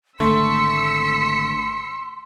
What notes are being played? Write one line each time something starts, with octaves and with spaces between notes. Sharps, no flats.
G#1 D3 A3 C6 E6 B6 C#7